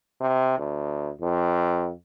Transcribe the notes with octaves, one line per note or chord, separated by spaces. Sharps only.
C3
D2
F2